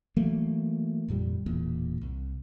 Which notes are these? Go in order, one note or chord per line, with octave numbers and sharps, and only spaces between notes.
E3 F#3 A3 A#3
G#1 F2 A#2 G3
E1 E2 A#2
C2